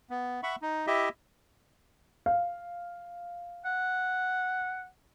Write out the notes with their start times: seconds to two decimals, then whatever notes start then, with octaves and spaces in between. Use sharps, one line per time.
0.10 B3
0.43 E5 F#5 B5 C#6
0.62 D#4
0.87 E4 G4 D#5 E5
2.26 F5
3.65 F#5